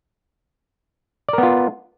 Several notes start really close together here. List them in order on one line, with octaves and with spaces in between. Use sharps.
D5 A#4 B3 F4